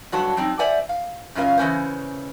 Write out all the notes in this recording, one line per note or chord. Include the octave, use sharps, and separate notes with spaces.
G2 D3 F#3 F#4 F#5 A5
F#3 C4 D#4
C5 D5 E5 F#5 G#5
F5
F#2 C#3 C#4 F4 A#4 F5
C#3 E3 F#3 C#4 A#4 C5